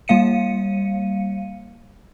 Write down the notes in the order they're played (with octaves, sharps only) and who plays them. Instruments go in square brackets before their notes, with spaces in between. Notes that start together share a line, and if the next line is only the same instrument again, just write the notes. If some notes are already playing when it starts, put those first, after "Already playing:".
[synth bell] G3 A#3 F5 C#7 D#7